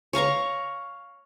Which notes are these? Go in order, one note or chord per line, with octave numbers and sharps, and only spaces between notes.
C#5 F5 A#5 C#6